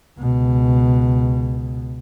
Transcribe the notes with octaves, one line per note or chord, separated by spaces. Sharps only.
C#2 B2